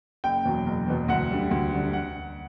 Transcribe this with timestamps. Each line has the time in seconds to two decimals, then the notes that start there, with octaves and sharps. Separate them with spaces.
0.24 F#1 G5
0.45 E2 B2 F#3
0.67 F#1
0.88 E2 B2 F#3
1.08 D2 F#5
1.31 D3 G3
1.51 D2
1.73 D3 G3
1.93 F#5